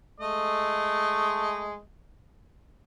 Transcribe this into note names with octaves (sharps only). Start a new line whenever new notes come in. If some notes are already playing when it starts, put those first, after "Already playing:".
G#3 A3 D#5